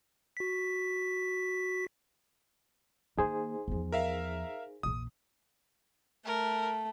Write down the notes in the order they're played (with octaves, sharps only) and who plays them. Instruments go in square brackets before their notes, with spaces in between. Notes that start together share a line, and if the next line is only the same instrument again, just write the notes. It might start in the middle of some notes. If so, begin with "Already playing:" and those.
[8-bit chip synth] F#4 B6
[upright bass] D#3 A#3 [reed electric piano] D#4 G#4 C5
[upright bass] E2 F3
[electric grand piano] A#4 E5 F5
[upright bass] A#1 E2 [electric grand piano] D#6
[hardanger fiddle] A3 [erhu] A#4